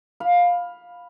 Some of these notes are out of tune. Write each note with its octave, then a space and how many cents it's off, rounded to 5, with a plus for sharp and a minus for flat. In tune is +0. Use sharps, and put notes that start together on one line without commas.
F5 +15 B5 +0